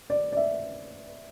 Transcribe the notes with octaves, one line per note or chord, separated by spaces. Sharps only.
D5
D5
E5